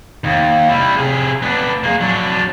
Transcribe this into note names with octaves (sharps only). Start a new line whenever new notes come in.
D#2
G3 E4
C3 G#4
B3 D4
A#3 G#4
F#3 D4